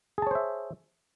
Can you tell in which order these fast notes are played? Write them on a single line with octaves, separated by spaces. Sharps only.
G#4 A5 C#5 C5 E5